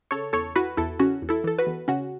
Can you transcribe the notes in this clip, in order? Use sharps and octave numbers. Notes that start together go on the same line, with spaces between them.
C#3 A4 C#5
E2 A4 C#5
E3 F#4 B4
E2 E4 A4
C#3 C#4 F#4
E2
E4 A4
E3 A4
F#4 B4
E2
C#3 C#4 F#4